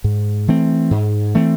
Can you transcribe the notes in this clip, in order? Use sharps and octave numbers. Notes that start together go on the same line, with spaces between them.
G#2
E3 A3 C4
G#2
E3 A3 C4